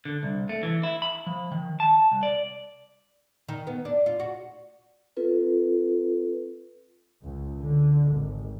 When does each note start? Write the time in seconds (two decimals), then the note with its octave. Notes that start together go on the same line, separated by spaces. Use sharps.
0.05 D3
0.23 C2
0.49 A3
0.63 E3
0.83 E4
1.02 B5
1.27 F3
1.52 D#3
1.80 A5
2.12 C2
2.23 D5
3.48 D#3
3.67 B3
3.85 D4
4.06 F4
4.20 F#4
5.17 C4 F4 A4 B4
7.23 C#2
7.59 D3
8.13 G#1